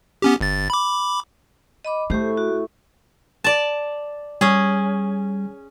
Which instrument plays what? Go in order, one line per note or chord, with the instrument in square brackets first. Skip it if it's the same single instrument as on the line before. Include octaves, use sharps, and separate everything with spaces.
[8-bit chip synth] B3 C#4 G4
G1 A6
B5 D6
[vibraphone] D#5 B5 D6
[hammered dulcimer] A2 C#6 [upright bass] A3 [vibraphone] G4 C5
[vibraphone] F#4
[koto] D5 A5
[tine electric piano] G3 [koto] C#4 G#4